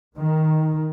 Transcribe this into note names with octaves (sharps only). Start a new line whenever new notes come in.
D#3